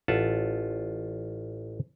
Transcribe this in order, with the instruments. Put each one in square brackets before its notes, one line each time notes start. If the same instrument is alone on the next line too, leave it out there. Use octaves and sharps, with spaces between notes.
[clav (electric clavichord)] A1 F4 E5 F#5 A5